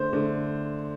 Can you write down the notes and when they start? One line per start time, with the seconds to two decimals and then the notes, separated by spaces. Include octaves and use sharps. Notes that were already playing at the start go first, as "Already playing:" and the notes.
Already playing: D3 A3 C5
0.13 D3 A3